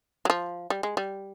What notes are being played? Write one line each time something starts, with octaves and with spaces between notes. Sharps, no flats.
F#3
F3
G3
G#3
G3